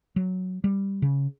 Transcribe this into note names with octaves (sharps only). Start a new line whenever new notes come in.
F#3
G3
C#3